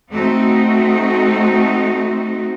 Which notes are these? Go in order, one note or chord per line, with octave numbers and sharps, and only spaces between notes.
A3 C4 D#4 F#4